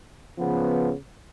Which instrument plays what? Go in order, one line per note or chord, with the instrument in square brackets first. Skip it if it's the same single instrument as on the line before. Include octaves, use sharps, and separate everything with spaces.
[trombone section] C#3 F3 B3